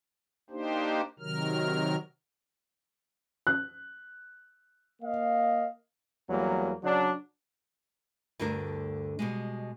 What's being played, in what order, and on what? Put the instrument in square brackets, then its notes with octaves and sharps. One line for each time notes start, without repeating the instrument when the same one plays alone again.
[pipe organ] A#3 D4 D#4 G4 C5
C3 D#3 F#3 A#4 F6
[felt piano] F#6
[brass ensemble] A#3 D#5 F5
[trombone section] E2 F#3 G3 A#3
C#3 F#3 D4
[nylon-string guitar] D2 G2 D3 D4 A#4
B2 G3 G#3